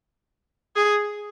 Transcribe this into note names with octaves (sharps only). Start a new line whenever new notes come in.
G#4